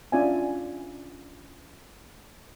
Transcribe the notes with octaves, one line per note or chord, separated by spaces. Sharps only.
C#4 D4 F4 D5 E5 G#5